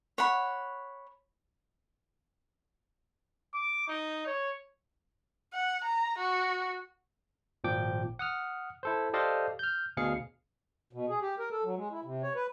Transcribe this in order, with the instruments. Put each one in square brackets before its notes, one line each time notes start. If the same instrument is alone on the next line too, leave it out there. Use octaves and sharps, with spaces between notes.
[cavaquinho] C#5 F#5 B5
[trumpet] D6
D#4
C#5
[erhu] F#5
A#5
F#4
[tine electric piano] G#1 A#2 F3 G5 D6
F#5 D#6 F6
E4 A4 C5
G4 A4 C5 D5 D#5 F5
F6 G6
D2 B2 G#4 F5 C#7
[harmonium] B2
G#4
G4
A#4
A4
F#3
G#3
E4
C3
C#5
B4